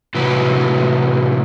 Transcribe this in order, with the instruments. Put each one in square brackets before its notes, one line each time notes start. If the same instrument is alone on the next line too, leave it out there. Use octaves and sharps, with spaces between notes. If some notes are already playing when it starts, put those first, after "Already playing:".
[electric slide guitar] A2 C3 E3 F#3 B4